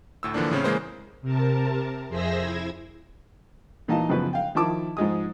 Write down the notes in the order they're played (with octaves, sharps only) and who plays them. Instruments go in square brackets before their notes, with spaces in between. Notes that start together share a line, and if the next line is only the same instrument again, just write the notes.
[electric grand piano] D2 A2 E6
D3 E3 F3 A#3 D4
A2 C#3 C4 C#4
C#3 E3 G#3 A#3 C5
[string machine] C3 A#4 A5
F2 G#4 C5 E5 E6 A#6
E4 G#6
[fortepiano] A#2 E3 D#4 D#5 F5 A5
F#2 C#3 F3 B3 B4
F5 G5
D#3 F3 E4 A5 D6
G#2 F3 G#3 D#6